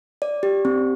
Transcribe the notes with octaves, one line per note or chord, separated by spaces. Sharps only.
D5
G4
C4